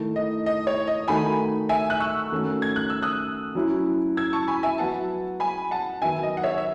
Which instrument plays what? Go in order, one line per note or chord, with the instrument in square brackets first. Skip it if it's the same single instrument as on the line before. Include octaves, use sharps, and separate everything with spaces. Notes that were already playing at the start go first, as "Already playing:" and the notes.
Already playing: [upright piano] D#3 A3 E4
[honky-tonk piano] D#5
D#5
C#5
D#5
[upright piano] D#3 A3 D#4 F#4 [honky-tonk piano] G#5 B5
[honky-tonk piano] E5 G#5
F#6
C#6 E6
[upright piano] D#3 A3 C#4 F#4
[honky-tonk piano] G#6
F#6
E6
D#6 F#6
[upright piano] F#3 C#4 E4
[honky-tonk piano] E6 G#6
A5 C#6
G#5 B5
E5 G#5
[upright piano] F#3 B3 F#4 [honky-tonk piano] F#5 A5
[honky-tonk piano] G#5 B5
F#5 A5
[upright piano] D#3 F#3 B3 [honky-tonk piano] E5 G#5
[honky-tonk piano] D#5
F#5
C#5 E5
E5